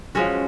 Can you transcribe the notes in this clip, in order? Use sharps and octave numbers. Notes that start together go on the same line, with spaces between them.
F3 G#3 C#4 F#4